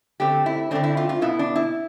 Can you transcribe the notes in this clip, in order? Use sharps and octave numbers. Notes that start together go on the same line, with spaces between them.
D3 A3 C4 G4
E4
D3 A3 C4 D4
E4
F4
F4
B2 B3 E4
D4
E4